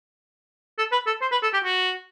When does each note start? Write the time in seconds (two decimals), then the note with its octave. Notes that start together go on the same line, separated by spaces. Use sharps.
0.78 A4
0.92 B4
1.07 A4
1.21 C5
1.31 B4
1.43 A4
1.53 G4
1.64 F#4